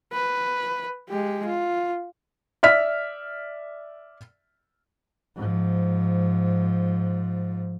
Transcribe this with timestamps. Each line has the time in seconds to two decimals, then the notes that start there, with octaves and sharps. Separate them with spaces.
0.13 B4
1.10 G#3 G4
1.46 F4
2.63 D5 E5 F6 B6
5.36 G#2 F3